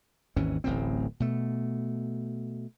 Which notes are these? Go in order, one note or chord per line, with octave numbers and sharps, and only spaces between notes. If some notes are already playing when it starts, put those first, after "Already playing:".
G#1 D#2 E3 C#4
D1 A1 A2 C4
B2 A3